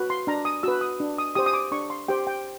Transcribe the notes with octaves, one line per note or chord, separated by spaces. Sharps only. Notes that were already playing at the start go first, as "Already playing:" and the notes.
Already playing: F#4 B4
C6
D4 A#5
D#6
F#4 B4 E6
D#6
D4
D#6
G4 C5 D#6
D#6
D6
D4 C#6
C6
G4 C5 G5
G5